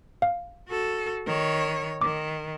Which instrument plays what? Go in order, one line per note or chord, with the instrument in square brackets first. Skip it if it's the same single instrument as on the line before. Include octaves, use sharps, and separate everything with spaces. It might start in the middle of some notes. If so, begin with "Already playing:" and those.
[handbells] F5
[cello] F#4 A4
D#3 C#5
[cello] D#3 [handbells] D6